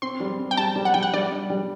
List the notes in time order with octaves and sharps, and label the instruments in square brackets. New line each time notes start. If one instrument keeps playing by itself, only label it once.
[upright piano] C4 [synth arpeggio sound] C6
[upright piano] G3
C4
[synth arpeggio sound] G5
[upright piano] G3 [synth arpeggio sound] A5
[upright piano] G3
[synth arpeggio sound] F#5
[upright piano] G3 [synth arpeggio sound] G5
[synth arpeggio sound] F#5
[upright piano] G3 [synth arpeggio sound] D5
[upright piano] D4
G3